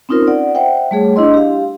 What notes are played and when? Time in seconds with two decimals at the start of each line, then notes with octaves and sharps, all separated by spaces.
0.09 C4 C#4 D#4 F4 A#4 C5
0.27 D5 F#5
0.55 C5 E5 F#5 G5
0.91 G3 A3 G#4 C#5
1.16 D4 E4 D#5 C6
1.34 G4 F5